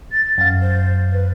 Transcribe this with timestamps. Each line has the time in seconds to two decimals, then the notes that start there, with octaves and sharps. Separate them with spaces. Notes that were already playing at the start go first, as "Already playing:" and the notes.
0.12 A6
0.38 F#2 F5
0.61 C5
1.12 B4